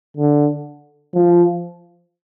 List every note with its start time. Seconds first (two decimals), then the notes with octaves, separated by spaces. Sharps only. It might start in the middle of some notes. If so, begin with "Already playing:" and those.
0.17 D3
1.14 F3